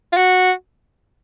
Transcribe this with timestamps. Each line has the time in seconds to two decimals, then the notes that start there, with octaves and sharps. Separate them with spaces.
0.13 F4
0.17 F#4